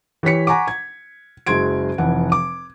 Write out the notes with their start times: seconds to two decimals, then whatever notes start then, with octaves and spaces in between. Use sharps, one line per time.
0.23 E3 G4 C#5 B6 C#7
0.47 F#5 G#5 A#5 C#6 D6
0.68 G#6
1.46 F#1 F#3 G#3 C6 G#6 D7
1.98 F1 E3 F#5
2.32 D6